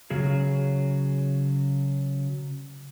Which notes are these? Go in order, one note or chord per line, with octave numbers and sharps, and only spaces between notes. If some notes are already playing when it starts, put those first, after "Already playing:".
C#3 F#3 G#4